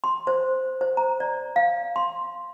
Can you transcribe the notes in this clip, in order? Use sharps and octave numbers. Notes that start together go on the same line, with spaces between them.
C6
C5
C5
A#5
D5
F5
C6